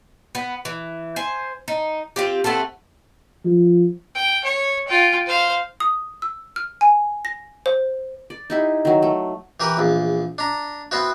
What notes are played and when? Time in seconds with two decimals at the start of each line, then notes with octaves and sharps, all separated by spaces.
0.35 B3
0.65 E3
1.16 C5 G#5
1.68 D#4
2.16 C4 F4 G4
2.44 A3 B3 C4 A4
3.45 F3
4.15 G5
4.44 C#5
4.88 F4 G5
5.26 C5 F5
5.80 D#6
6.22 E6
6.56 F6
6.81 G#5
7.25 A#6
7.66 C5
8.30 D5
8.50 D#4 E4 G4
8.85 D#3 F#3
9.02 A3
9.60 E3 G4 A#4 B4
9.77 A#1 E2
10.38 D4 A#5
10.91 B3 C4 E4 F#4